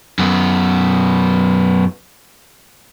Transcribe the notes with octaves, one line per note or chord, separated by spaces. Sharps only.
F#2 B3